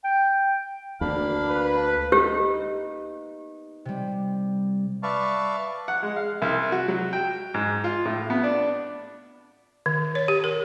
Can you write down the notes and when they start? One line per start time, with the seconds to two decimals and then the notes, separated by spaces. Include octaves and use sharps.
0.04 G5
1.01 D2 A#3 D4 F5 B5
1.49 B4
2.12 A#3 B3 D#4 G4
3.85 C3 G3
5.03 B4 D5 E5 F5 A5 C#6
5.88 F#5
6.03 G#3
6.16 F5
6.42 C2
6.72 F#4
6.88 F#3
7.13 G5
7.54 G#2
7.84 F4
8.05 A2
8.30 B3
8.43 D4
9.86 D#3
10.15 C#5
10.28 G4
10.44 A#4